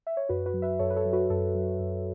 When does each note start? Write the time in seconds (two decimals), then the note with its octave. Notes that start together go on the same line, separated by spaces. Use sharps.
0.07 E5
0.17 C#5
0.29 F#2 F#4 B4
0.46 F#4 B4
0.54 F#3
0.62 B4 E5
0.79 F#2 A4 C#5
0.90 B4
0.96 A4 C#5
1.05 F#3
1.13 F#4 B4
1.30 F#2 A4
1.55 F#3
1.80 F#2